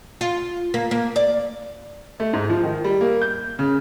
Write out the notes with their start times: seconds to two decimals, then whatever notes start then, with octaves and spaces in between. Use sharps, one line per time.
0.21 F4
0.74 A#3
0.91 A#3
1.16 D5
2.20 A3
2.33 G#2
2.50 F3
2.63 D#3
2.84 G3
3.01 A#3
3.22 G6
3.59 C#3